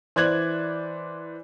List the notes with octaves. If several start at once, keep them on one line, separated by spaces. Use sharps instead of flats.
E3 C5 D5 F#6 G#6 F#7